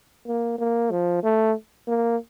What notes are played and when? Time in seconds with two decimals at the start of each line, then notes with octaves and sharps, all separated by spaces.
0.27 A#3
0.59 A#3
0.91 F3
1.23 A3
1.88 A#3